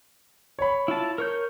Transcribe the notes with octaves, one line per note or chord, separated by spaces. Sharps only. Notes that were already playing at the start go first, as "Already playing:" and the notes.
C#5 B5
E4 F4 A5
A#4 C#5 G6